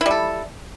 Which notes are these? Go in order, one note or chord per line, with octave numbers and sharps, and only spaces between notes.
G3 E4 A4